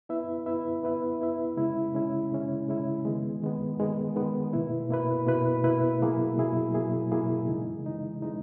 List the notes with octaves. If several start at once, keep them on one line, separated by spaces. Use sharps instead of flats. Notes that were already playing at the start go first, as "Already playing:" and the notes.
B3 E4 B4 E5
B3 E4 B4 E5
B3 E4 B4 E5
B3 E4 B4 E5
C#3 G#3 C#4 E4
C#3 G#3 C#4 E4
C#3 G#3 C#4 E4
C#3 G#3 C#4 E4
D#3 G#3 B3
D#3 G#3 B3
D#3 G#3 B3
D#3 G#3 B3
B2 A#3 E4 B4
B2 A#3 E4 B4
B2 A#3 E4 B4
B2 A#3 E4 B4
B2 F#3 A#3 E4 G#4
B2 F#3 A#3 E4 G#4
B2 F#3 A#3 E4 G#4
B2 F#3 A#3 E4 G#4
C#3 E3 G#3 D#4
C#3 E3 G#3 D#4
C#3 E3 G#3 D#4